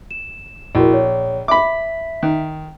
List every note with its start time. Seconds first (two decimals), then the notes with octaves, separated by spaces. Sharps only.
0.11 E7
0.75 A#1 E4 F#4 A#4
0.93 C#5
1.48 E5 B5 D6 B6
2.23 D#3